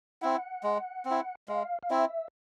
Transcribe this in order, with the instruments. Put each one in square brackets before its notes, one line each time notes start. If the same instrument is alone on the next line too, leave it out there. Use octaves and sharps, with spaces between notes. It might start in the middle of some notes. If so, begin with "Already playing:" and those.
[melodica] C4 E4 [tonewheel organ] F#5
[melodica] G#3
C4
E4
[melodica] G#3 [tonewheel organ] F5
[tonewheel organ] F5
[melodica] C4 E4 [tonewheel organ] E5